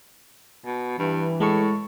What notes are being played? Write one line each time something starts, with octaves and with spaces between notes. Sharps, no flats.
B2
G2 E3
A2 G#3 C#6